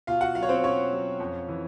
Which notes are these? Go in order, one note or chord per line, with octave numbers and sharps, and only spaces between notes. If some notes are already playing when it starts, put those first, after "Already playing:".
B2 F4 F5
F#4 F#5
F#3 F4 F5
C#5
C4 C5
B2 C#4 C#5
F#3
F2
E3